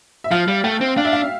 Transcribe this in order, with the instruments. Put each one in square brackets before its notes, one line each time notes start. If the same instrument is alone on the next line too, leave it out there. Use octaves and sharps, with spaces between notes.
[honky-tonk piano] E5
[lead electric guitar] F3 [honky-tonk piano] F5
[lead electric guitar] G3
[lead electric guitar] A3 [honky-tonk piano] G5
[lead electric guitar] C4
[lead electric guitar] D4 [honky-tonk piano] F5
[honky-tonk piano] E5
F5